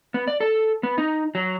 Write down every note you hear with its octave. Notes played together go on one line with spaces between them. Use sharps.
B3
D5
A4
B3
D#4
F#3